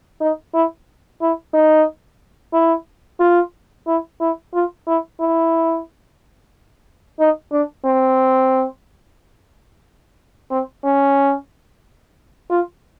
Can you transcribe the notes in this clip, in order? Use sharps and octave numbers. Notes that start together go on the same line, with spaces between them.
D#4
E4
E4
D#4
E4
F4
E4
E4
F4
E4
E4
D#4
D4
C4
C4
C#4
F4